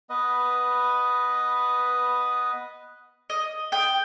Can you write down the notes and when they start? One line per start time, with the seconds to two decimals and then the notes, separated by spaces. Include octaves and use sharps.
0.10 B3 B4 D#5
3.30 D#5
3.72 G5 D#6